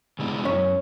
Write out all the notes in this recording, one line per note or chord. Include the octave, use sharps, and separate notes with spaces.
C#3 G#3 B3 E4
F#2 C#4